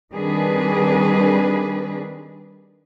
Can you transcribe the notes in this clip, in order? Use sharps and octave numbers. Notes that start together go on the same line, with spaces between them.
D#3 G3 C4 D4 G#4 B4